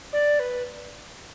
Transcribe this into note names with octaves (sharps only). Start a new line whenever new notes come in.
D5
B4